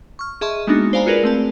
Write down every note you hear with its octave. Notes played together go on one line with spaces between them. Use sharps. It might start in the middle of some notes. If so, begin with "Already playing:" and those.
C#6 F6
G#4 D#5 E5 A5 C6 C#6
G#3 A#3 B3 D4 D#4 F#4
C5 D5 F5 G#5 A#5 B5
F4 F#4 G#4 A#4 B4 D5
A3 C4 A5